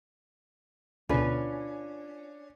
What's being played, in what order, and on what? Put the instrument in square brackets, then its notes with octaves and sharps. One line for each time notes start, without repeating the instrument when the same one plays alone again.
[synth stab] D2 B2 [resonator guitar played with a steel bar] C#4 [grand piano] D4 [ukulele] F4 B4